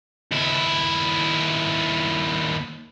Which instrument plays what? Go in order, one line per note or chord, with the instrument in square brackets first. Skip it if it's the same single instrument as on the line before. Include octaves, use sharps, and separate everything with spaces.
[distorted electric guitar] D#2 E4